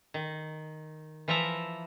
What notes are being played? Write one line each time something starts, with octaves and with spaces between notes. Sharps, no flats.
D#3
E3 F3 E5 A5 A#5